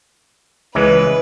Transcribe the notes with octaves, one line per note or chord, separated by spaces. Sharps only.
C#2 E3 G#3 B4